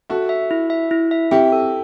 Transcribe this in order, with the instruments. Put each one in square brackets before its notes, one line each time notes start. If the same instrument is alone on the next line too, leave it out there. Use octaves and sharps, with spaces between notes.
[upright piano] F#4 A4 [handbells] E5
[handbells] E5
E4
E5
E4
E5
[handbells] C4 [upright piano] E4 G4
[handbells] A4